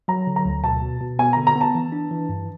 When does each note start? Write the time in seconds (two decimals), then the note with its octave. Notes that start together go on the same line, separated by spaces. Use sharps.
0.08 F#3 A#5
0.27 D3
0.36 A#5
0.45 D2
0.64 B2 A5
0.82 B2
1.01 B2
1.19 B3 G#5
1.33 D3 A#5
1.47 A#5
1.56 B3
1.61 A5
1.75 E3
1.92 D4
2.11 E3
2.29 G2